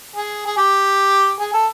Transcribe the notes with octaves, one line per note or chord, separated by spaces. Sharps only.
G#4
G#4
G4
G#4
A4